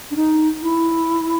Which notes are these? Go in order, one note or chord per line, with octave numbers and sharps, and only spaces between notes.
D4
D#4
E4